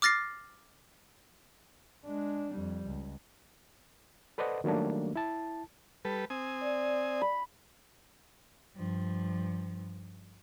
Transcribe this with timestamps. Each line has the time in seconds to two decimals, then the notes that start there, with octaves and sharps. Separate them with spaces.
0.02 D6 F6 A6 A#6 C7
2.05 G#3 D4
2.51 F2 G3
2.87 C#2
4.38 A4 B4 C5 D5 D#5 F#5
4.64 D#3 F#3 G3 A3 A#3 D4
5.16 E4 A5
6.05 G3 A4 B4
6.30 C4 G#5 D#6
6.61 D5
7.21 B5
8.76 G2 F3